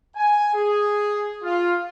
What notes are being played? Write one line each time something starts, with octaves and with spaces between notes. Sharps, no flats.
G#5
G#4
F4